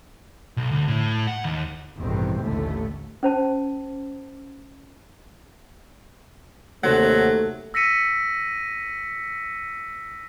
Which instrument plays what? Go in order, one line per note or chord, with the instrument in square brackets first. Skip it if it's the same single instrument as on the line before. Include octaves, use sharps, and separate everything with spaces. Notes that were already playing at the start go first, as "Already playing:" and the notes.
[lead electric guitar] B1
D2
A2
F#5
D#2
[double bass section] A1 E2 G2 B2 D#3 C4
A1 D#2 A2 D3 A3
[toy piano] C#4 C5 A5
[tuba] D#2 [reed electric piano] C3 C5 F#5 [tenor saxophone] F#3 [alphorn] A3
[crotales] E6 A#6 B6 C#7 D#7